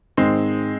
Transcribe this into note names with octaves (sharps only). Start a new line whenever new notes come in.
G#2 D#3 G#3 C4